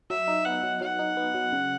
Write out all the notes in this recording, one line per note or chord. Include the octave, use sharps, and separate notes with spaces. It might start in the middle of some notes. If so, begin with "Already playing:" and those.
F#3 E5
D#4
B3 F#5
F#3
F#3 F#5
D#4
B3
F#3
C#3